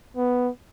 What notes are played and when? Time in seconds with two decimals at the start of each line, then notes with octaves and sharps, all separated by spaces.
0.17 B3